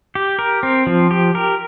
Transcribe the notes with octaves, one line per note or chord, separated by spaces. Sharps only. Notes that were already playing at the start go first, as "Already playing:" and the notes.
G4
A#4
C4
F3
G4
A#4